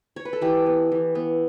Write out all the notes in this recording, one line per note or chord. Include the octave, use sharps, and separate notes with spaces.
C#5
B4
A4
E3 G4
B3
E3
B3